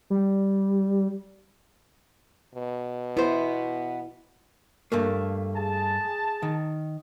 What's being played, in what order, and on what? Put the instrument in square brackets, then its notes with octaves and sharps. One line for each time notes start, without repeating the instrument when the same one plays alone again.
[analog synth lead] G3
[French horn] B2
[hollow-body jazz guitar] B3 C5 [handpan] E4
[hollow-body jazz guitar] G2 A3 A#3
[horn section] G#4 A5
[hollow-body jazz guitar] D#3